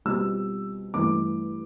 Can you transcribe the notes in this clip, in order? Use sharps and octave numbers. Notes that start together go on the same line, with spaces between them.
B2 G3 C4 F4 E6
G2 E3 A3 D6